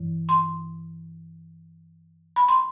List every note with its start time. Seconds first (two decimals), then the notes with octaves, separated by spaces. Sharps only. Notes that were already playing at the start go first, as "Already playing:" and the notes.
Already playing: G2 E3
0.29 C6
2.36 B5
2.48 C6